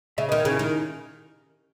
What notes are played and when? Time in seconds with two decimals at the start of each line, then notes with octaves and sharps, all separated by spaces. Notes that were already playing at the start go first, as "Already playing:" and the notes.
0.18 C#3 C#5 E5
0.29 B4 D#5
0.32 D#3
0.39 A#4 C#5
0.45 C#3
0.51 C#4 E4
0.59 D#3